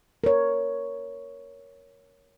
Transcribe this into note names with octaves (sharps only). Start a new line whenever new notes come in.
A#4 C#5